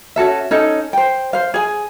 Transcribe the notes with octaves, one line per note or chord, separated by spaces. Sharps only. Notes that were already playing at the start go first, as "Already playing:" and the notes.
C#4 F#4 A4 E5
C#4 D#4 A4
C5 G5
C5 F5
G#4 G#5